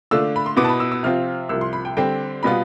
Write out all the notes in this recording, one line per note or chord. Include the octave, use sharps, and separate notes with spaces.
D3 A3 D4 F4 E6
B5
C6
B2 B3 E4 D6
A5
B5
E6
E6
C3 F3 C4 F4 F6
C2 C3 F3 E6
C6
B5
G5
D3 G3 C4 G5
B2 G3 B3 F4 B5